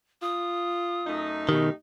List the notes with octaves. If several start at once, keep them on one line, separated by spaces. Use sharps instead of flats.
F4 D#6
F#2 A3 D#4
B2 D#3 G4